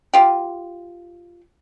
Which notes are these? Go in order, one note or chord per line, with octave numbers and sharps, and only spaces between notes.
F4 G4